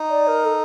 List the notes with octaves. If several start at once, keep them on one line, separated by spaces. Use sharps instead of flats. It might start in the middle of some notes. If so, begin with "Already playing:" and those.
Already playing: D#4
D5
A#4
A4